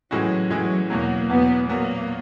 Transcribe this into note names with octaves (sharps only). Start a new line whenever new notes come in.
A2 E3 F#3 G#3 C#4 F#4
A2 E3 F#3 G#3 C#4 F#4
E2 B2 F#3 A#3
E2 B2 F#3 B3
A#2 F#3 A#3 B3